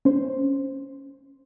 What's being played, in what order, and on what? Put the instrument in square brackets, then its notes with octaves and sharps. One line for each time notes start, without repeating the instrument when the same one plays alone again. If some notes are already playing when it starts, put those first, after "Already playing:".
[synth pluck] C#4 C5